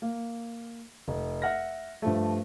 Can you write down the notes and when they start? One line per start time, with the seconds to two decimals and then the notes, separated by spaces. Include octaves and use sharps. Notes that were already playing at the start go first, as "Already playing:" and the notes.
0.02 A#3
1.08 F1
1.42 E5 F#5 F6 A#6
2.02 G2 F3 A3